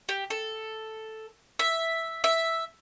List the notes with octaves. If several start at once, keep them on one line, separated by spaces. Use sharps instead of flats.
G4
A4
E5
E5